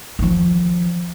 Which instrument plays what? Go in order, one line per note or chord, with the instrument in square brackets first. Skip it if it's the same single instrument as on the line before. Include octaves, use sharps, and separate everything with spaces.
[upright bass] D#3 F3